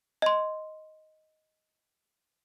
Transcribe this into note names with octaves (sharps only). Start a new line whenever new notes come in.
D#5 C6